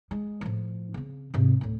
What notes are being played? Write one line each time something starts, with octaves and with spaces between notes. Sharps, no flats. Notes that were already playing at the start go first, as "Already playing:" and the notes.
G#3
A2 F3
C#3 C4
G#2 C3
D2 A2